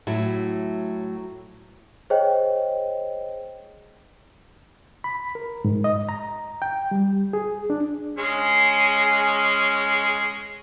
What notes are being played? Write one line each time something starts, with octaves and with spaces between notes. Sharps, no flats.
A2 F#3 E4
G#4 C5 C#5 D#5 G5
B5
A#4
G#2
D#5
A#5
G5
G3
G#4
D4
G#3 C#4 G#4